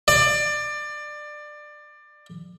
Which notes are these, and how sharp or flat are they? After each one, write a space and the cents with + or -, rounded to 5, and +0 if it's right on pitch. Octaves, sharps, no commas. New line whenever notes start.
D5 +20